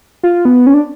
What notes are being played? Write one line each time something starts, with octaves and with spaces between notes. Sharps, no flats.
F4
B3
C#4
D4